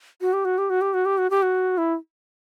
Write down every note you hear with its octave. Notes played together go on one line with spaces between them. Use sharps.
F#4
G4
F#4
G4
F#4
G4
F#4
G4
F#4
G4
F#4
E4